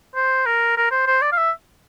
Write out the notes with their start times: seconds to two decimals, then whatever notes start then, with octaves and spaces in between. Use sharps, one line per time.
0.15 C5
0.46 A#4
0.77 A#4
0.91 C5
1.07 C5
1.22 D5
1.32 F5
1.37 E5